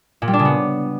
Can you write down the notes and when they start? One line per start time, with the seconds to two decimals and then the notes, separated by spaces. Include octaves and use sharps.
0.22 A#2
0.28 G3
0.33 D4
0.39 C#3
0.45 B3